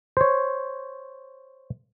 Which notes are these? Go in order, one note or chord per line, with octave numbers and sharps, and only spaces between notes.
C5 C#5